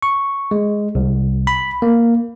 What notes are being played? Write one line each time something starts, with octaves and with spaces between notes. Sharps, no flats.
C#6
G#3
C2
B5
A#3